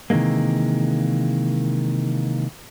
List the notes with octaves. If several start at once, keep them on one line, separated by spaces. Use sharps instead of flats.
C3 D#3 E3 G#3 A#3